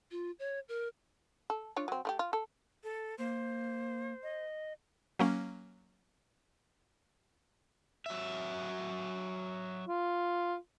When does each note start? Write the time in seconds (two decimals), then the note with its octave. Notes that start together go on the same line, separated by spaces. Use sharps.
0.11 F4
0.39 C#5
0.69 A#4
1.50 A4
1.76 D4 F4 C#5
1.88 F#3 C4
2.05 A3 F4 G4
2.19 F4
2.33 A4
2.84 A4
3.18 A#3 C5
4.23 D#5
5.19 F#3 A#3 C#4
8.06 F#3 E5
9.88 F4